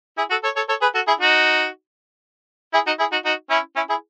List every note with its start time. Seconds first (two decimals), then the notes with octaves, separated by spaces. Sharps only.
0.17 E4 G#4
0.30 F#4 A4
0.43 A4 C#5
0.56 A4 C#5
0.69 A4 C#5
0.81 G#4 B4
0.95 F#4 A4
1.07 E4 G#4
1.20 D#4 F#4
2.73 E4 G#4
2.87 D#4 F#4
2.99 E4 G#4
3.12 D#4 F#4
3.25 D#4 F#4
3.50 C#4 E4
3.76 C#4 E4
3.89 E4 G#4